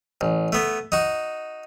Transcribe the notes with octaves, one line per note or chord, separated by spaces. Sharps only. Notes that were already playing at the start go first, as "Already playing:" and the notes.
A1
A3 B3
D#4 F#4